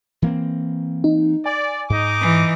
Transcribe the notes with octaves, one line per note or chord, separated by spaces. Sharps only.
E3 A#3 C4
D#4
D5 G#5
G#2 D#4 D#5 D6
E3